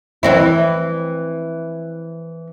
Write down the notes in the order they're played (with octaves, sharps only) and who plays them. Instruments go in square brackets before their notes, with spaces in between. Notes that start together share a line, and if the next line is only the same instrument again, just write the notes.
[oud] E3 C4 E4